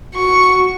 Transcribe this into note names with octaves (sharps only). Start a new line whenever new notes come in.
F#4 C#6